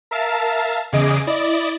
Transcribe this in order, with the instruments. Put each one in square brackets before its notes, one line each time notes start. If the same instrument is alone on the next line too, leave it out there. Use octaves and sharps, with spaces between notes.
[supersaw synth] A#4 E5 F5 A5
E2 C#3 G#4 D#5 D6 D7
E4 D5 D#5